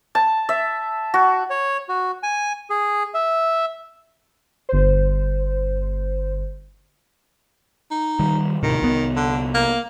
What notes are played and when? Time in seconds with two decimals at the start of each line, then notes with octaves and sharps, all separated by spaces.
0.15 A5
0.49 E5
1.14 F#4
1.50 C#5
1.89 F#4
2.23 G#5
2.70 G#4
3.14 E5
4.69 G1 C5
7.91 D#4
8.19 D#3 G3
8.63 D#1 A2 C3 D#3
8.82 C2 B3
9.16 D3
9.54 A#3